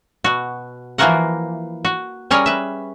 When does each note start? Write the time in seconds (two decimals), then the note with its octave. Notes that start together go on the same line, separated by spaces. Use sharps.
0.24 B2 F#4
0.98 E3 F3 A#3 F#4 A#4 F#5
1.85 F#4
2.31 G3 C#4 G#4 A#4 C#5
2.46 B4 E5